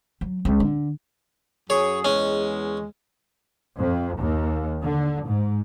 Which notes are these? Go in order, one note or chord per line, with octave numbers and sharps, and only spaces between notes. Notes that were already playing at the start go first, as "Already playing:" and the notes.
F#3
C#2
D3
F#2 G#4 C#5
E2 G#3 C#4
F2
D#2
D3
G#2